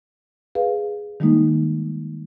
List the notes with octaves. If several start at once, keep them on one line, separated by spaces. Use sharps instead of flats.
G#4 B4 F5
D#3 G3 G#3 A#3 D#4